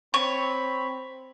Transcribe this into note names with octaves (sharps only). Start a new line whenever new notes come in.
C4 C#5 B5